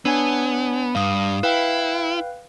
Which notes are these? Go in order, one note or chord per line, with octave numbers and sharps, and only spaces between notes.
B3 D4 C#5 G#5
G2 F5 D#6
E4 B4 F5 G5